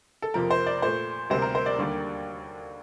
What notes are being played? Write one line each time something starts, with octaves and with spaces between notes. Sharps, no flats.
A4
F2 C3 F3 A#3 A#4
C5
D5
A#2 A3 C5
D2 C3 G3 A#3 C5
A#4
C5
D5
D#2 D3 G3 A#3